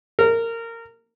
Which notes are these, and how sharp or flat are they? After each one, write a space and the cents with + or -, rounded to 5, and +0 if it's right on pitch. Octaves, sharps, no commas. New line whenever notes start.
A#4 -20